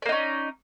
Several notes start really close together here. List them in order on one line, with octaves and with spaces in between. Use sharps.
D5 A#3 D#4 C#4